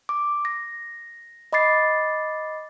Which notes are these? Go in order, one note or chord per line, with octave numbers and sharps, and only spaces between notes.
D6
A#6
D#5 B5 D6 A6 C7